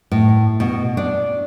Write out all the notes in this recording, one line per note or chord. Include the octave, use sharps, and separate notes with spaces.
A2
B2
D4